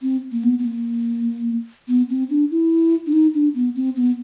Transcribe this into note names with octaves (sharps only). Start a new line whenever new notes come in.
C4
A#3
B3
B3
A#3
B3
C4
D4
E4
D4
D#4
D4
B3
C4
B3